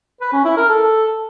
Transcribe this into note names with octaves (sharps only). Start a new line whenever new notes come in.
B4
C#4
E4
A#4
A4